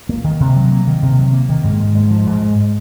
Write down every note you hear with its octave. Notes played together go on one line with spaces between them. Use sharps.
A#3
D#3
C3
F#3
A#3
D#3
C3
F#3
A#3
D#3
G#2
G#3
G#2
F3
G#2
G#3